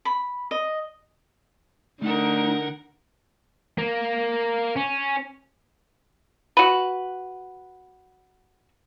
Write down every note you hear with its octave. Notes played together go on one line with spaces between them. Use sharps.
B5
D#5
D3 A3 D4 D#4 A#4 F#5
A#3
C#4
F#4 B4